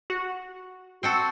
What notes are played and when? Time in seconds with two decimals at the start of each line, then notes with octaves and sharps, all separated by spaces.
0.10 F#4
1.03 C4 F#4 A4